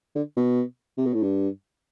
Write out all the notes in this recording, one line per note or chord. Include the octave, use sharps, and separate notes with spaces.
D3
B2
C3
B2
A2
G2